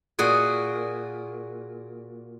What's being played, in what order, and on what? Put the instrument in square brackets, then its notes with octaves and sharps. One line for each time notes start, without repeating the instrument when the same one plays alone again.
[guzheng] A#2 F#4 G#4